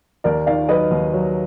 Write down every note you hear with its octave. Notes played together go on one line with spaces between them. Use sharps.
D#2 A#4 D5
D#3 D5 F5
F#3 B4 D#5
D#2
F#3